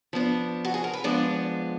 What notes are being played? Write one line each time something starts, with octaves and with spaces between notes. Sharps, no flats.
F3 B3 D4
F#4
G#4
A#4
B4
F3 G#3 B3 D4 D5